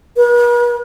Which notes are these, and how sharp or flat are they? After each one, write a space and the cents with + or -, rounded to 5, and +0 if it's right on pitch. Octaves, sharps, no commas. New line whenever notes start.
B4 -45